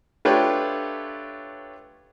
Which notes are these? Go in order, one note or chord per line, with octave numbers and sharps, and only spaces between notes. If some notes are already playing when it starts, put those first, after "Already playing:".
A3 D4 F4 G4 B4 C#5